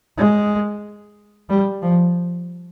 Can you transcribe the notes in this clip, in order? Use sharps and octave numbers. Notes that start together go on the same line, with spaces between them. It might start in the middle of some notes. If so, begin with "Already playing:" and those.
G#3
G3
F3